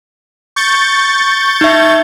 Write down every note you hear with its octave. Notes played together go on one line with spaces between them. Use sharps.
C#6 G6 A6
D#4 E5